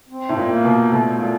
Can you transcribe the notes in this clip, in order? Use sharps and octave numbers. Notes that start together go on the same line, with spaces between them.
C4
A2
A#2
A#3
B2
B2 A3
A#2 A3